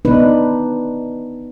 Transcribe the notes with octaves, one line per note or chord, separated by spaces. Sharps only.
B3 D4 D#4 B4